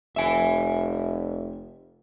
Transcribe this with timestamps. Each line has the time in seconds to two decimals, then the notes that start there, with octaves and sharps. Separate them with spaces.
0.16 F1 E5 G#5